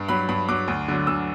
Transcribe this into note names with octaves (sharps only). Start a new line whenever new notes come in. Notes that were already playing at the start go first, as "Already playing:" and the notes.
Already playing: G2
F#3 B5
G2 B5
F#3 D6
D2
D3 F#3
D2 E6